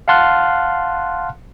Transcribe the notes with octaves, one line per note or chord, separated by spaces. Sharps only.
F5 F#5 A5 C6 F6 F#6